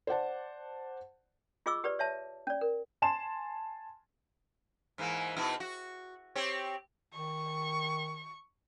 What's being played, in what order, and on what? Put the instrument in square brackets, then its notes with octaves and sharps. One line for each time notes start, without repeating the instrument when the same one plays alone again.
[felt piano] C5 D5 F#5 A5
[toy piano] F4 G#4 D#5 C#6 D6 E6
G4 B4 D5
C#5 E5 A5
C#4 D5
A#4
[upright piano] G#5 A5 C6 E7
[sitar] G#2 E3 A#3
B2 D#4 E4
F#4
C4 G4 C#5
[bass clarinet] D#3 [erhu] C#6